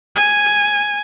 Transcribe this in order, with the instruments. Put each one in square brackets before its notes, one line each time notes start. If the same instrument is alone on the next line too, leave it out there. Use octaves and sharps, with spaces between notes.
[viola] G#5